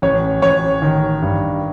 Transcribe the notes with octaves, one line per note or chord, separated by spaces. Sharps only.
A1 C#5
A1 C#5
D#3
G2